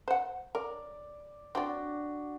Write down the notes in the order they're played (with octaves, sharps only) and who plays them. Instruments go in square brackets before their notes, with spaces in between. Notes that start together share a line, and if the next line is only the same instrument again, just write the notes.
[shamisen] C5 F#5
[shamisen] A#4 [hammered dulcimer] D5
[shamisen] C4 D5 [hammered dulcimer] D4 F#4 D6